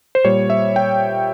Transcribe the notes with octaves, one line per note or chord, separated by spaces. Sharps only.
C5
A#2 G3 C#5
E5
G5